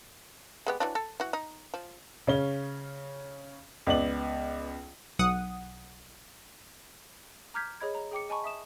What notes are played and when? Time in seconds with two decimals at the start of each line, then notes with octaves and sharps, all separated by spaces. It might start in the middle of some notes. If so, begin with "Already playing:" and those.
0.66 G#3 B3 G4
0.80 E3 F#3 D4
0.95 A4
1.20 E3 F#4
1.33 D#4
1.74 F3
2.27 C#3 C#4 G7
3.87 C#2 B3 D5 F#7
5.19 B1 F#5 D#6
7.54 A#5 D6 F6 G6 G#6 B6
7.80 G#4 C#5 D#5 B5 G#6
7.95 A#5
8.11 G#4 G5 D6 C#7
8.29 D#5 G#5 A5 B5 C#6
8.44 E5 D#6 E7